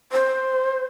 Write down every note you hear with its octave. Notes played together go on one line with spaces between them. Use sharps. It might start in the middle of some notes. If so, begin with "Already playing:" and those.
C5